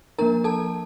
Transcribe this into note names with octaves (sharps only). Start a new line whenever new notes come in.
F3 A#3 D4 A#4 A#5
A4 A5